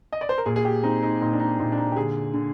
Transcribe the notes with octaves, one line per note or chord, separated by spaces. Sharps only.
D#5
D5
C5
A#4
A#2 G#4
G#4
G4
C4 D#4
D#4
A#2 D#4
D4
D#4
A#2 D#4
D4
D#4
G4
D3 G#4
D3